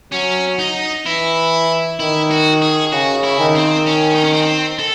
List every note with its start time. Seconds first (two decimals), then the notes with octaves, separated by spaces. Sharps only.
0.12 F#3 C#4
0.59 D#4
1.06 E3 E4
2.00 D#3 E4
2.31 F#4
2.62 G#4
2.92 C#3 F#4
3.24 E4
3.39 D#3
3.55 C4
3.86 C#4
4.15 D#4
4.24 C#4
4.33 C4
4.79 A4